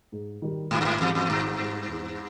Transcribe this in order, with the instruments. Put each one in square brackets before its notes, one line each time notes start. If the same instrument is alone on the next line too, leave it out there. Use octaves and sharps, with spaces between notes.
[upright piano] G#2
D#3 G3
[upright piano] G#1 [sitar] G#2
[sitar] G2
G#2
[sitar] E2 [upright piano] G#2 G3
[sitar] E2
[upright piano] G#1 [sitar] G2
[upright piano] G#2 G3
E2